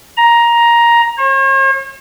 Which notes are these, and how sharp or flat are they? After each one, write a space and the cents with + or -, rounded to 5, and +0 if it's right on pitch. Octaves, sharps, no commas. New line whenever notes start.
A#5 +10
C#5 -45